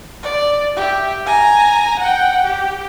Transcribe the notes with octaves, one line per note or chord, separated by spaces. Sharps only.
D5
G4 E5
G#5 A#5
F#5 G5
G4